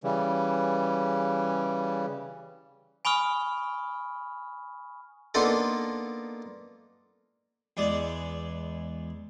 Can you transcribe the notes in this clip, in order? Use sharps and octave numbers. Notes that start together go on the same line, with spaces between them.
C#3 E3 G3
G#5 B5 C#6 D#6 F6
A#3 B3 D4 D#4 F4 A4
E2 G#3 D5